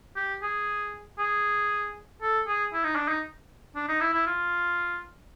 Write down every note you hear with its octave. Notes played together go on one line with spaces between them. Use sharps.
G4
G#4
G#4
A4
G#4
E4
D#4
D4
D#4
D4
D#4
E4
E4
F4